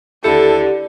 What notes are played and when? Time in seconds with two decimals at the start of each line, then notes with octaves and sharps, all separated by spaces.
0.24 D#2 D3 E4 G4 A4 C#7